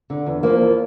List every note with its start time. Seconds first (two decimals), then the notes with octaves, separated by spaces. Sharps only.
0.10 D3
0.26 E2
0.43 F3 A#3
0.61 E2